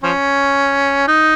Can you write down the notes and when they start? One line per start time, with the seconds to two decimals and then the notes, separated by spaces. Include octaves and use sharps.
0.04 F3 C#4
1.08 D#4